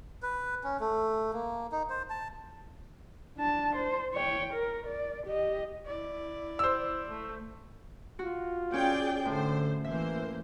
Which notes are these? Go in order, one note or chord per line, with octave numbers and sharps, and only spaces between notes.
B4
C#4
A3
A#3
D#4
C5
A5
D4 A5
C5
C#5 G5
A#4
D5
G4 D#5
E4 D5
C5 E6
A3
F4 F#4
C#4 G#4 D5 G5
A2 D3 C5
E3 A#3 C5 E5